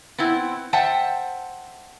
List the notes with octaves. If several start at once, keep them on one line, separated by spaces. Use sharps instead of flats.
B3 C4 E4
C5 E5 F#5 G5 A5